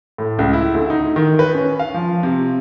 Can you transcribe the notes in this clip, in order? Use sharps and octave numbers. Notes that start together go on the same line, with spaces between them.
A2
C#2
E4
D2
D#4
D#3
B4
C#4
F5
F3
C3